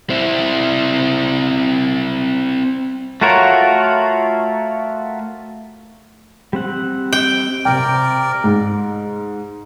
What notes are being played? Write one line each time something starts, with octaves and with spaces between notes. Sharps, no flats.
C4 E4
A3 F4 F#4 A#4 C#5
G3 C4 F#5
G5
C3 A#4 D5 G5
G#2